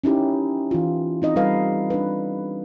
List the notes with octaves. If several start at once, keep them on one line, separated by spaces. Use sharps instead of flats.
C#4 D#4 E4 G4
E3 F4
C4 D#4 D#5
G3 A4 B4 F5
D4 B4